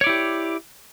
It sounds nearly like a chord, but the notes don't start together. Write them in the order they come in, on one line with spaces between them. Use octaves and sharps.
C#5 D5 E4 G4